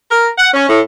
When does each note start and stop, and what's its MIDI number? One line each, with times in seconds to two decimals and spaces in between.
0.11 0.27 70
0.38 0.49 78
0.54 0.67 61
0.69 0.81 45